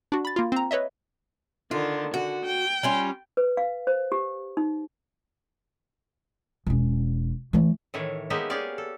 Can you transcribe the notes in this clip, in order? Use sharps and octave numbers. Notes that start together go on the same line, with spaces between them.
D4 F#4
B5 A6
A#3 F4
C4 A#5
B4 C#5 D#5 E5
D3 D#3 F4
D3 F#4
G5
G3 C#4 F4
B4
F5
C5
G4
D#4
E1 C#4
E3 A3
A2 D#3 E3 C#5
G#3 A#3 B3 D#4 G4 E5
G4 G#4 C#5 D5 F5
A4